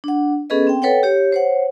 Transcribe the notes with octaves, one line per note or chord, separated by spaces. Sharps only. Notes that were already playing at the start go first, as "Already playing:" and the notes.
D4 F#5
B3 C#4 G#4 A4 B4 D#5
C4 G5
A4 B4 C#5 F#5 G5
G4 C#5
C5 C#5 F#5